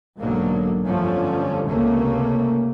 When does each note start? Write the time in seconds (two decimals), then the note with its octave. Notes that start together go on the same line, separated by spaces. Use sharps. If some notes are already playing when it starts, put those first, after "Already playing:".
0.20 B1 G#2 D3 F#3 A#3
0.86 G1 F2 D3 F3 A3 C#4
1.68 G#1 C#2 C3 A3 A#3 C#4